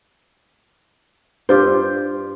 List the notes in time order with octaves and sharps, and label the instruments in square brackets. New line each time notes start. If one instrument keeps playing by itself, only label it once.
[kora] G2 F4 [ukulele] G4 C5